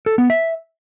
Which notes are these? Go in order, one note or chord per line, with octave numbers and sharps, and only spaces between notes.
A4
B3
E5